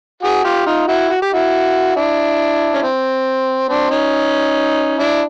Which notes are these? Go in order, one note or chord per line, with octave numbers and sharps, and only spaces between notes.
F#4 G#4
F4 G4
D#4 F4
E4 F#4
F#4
G4
E4 F#4
D4 E4
C#4
C4
C4 D4
C#4 D#4
D4 E4